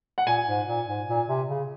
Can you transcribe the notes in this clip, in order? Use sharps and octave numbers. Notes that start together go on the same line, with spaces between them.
F#5
A#2 G#5
G#2
A#2
G#2
A#2
C3
C#3